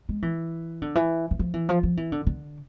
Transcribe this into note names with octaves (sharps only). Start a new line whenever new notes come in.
G#3
E3
D3
E3
E3
F3
E3
F3
F3
E3
D3
D3